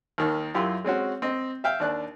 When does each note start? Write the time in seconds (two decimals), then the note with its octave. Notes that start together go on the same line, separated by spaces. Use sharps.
0.18 D#2 D#3
0.55 F#2 E4 F4 G4 C6
0.84 G#3 C4 C#4 F#4
1.22 C4 D#5
1.64 E5 F5 G5
1.80 D#2 D4 F#6